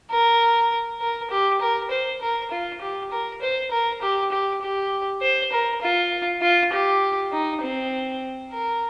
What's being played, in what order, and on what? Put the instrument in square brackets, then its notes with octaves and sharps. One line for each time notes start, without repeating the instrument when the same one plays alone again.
[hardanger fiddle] A#4
A#4
G4
A#4
C5
A#4
F4
G4
A#4
C5
A#4
G4
G4
G4
C5
A#4
F4
F4
G4
D#4
C4
A#4